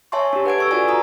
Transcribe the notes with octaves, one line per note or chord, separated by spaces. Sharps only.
C#5 E5 G#5 A5 C6 C#6
D4 G4
B4 F#5 G#6 D7
A4 C#6 E6
F4 F#4 B4 D5 G#5
A#5 D#6